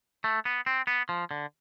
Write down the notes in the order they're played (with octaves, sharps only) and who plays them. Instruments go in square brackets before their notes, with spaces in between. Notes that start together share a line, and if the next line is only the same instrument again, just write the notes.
[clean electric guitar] A3
B3
C4
B3
F3
D3